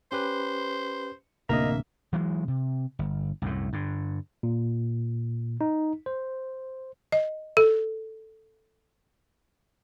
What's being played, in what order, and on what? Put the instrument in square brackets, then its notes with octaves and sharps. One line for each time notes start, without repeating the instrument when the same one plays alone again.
[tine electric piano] C#4 G4 B4 [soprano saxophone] C5
[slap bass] D1 C3 D4 [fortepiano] A#3 [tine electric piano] D#5 A#5 [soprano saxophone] E5
[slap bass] E3 F#3 G#3
C3
G1
C2 F#2 A2
G2 D3
[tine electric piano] A#2
D#4
C5
[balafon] D#5
A4